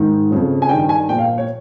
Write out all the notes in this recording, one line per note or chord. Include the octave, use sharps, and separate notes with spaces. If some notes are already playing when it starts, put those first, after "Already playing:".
Already playing: G#2 D#3
F2 C#3 F3
G#5
G2 D#3 G5
G#5
A#2 F3 G5
F5
C#5